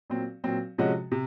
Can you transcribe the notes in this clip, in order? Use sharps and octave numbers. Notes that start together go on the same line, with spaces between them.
A#2 F#3 C4
A#2 F#3 C4
C3 F3 G#3 C#4 F#4
C3